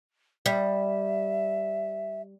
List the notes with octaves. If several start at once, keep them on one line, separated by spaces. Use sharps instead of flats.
G3 E5